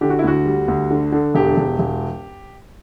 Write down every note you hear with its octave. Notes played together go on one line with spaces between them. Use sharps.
D3 G4
F#4
E4
D2 F#4
G3
D2
D3
D3
E1 G4
E1
E1